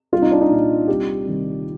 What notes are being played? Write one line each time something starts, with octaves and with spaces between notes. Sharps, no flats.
C2 F4
D#4
D4
D#4
A#2 G3
C2 G4
C3 D#3 G3